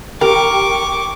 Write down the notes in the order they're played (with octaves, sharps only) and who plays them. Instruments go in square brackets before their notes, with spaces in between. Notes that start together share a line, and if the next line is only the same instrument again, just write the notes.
[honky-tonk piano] G4 [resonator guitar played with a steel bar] A#4 [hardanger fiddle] C#6 D6